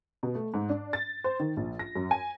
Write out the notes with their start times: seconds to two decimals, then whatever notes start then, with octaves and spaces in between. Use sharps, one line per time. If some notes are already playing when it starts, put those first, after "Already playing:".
0.23 B2
0.35 A3
0.54 G#2
0.69 D4
0.93 A6
1.24 C5
1.40 D#3
1.57 A#1
1.79 A#6
1.96 F#2
2.11 G#5